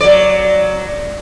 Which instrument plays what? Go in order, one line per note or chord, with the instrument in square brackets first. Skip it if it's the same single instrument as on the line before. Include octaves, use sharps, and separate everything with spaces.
[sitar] F#3 D5